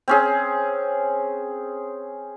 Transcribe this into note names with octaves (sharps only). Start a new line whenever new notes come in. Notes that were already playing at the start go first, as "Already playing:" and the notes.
C4 C#4 G#4